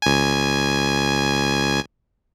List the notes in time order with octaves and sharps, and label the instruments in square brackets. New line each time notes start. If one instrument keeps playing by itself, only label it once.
[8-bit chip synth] C#2 G#5